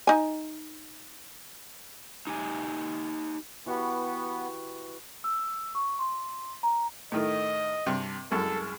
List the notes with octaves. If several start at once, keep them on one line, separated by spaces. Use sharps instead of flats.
D#4 G#5
D#4 G4 G#5
E3 B3 F#4 G4
E6
C#6
C6
A#5
A2 D#3 A3 D#5
G2 C3
C2 F#2 G#3 A4